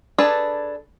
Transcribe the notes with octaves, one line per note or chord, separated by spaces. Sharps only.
D4 G#4 A4 B4